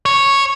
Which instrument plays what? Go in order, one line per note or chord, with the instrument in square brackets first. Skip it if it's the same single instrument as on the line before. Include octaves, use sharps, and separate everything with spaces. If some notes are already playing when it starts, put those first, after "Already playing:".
[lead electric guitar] C#5